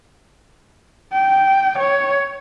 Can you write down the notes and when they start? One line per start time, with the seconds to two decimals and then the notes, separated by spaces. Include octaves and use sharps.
1.12 G5
1.78 C#5